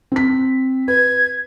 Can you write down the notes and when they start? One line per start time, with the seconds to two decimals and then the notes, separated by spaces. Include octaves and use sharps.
0.12 C4 B6
0.88 B4 G#6